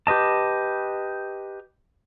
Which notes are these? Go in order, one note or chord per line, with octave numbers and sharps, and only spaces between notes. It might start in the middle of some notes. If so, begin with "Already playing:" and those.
G4 B4 D#5 A5